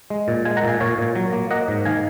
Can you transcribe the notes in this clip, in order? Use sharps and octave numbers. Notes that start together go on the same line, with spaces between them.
G#3
A#2
G#3 F5 G#5
F#5 A#5
A#2
F5 G#5
A#2 C#5 F5
A#2
F#3
A#3
A#3 D#5 F#5
G#2
D#3 F5 G#5